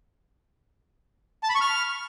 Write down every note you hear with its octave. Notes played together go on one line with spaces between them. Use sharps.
A5
B5
C#6
F6